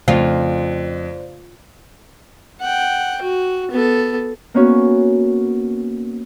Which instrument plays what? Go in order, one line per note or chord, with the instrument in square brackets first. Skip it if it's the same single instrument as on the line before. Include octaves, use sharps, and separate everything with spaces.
[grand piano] F2 [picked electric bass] C#3 A3 [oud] F4 [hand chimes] C5 D5
[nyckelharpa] F#5 G5
F#4
B3 A4
[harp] A#3 B3 C#4 F#4